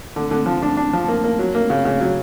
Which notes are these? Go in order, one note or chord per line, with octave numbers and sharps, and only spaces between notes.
D3
D3
F3
D4
D4
F3
A#3
A#3
F#3
A#3
C#3
C#3
F#3